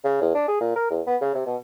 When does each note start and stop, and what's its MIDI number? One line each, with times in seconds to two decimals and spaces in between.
0.04 0.20 49
0.22 0.33 40
0.35 0.44 62
0.48 0.57 68
0.61 0.73 46
0.76 0.88 70
0.90 1.01 40
1.07 1.16 59
1.21 1.30 49
1.34 1.44 48
1.46 1.56 47